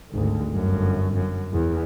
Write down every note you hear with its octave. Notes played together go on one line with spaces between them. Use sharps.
G#1 D2
G1 F#2
F#2
E2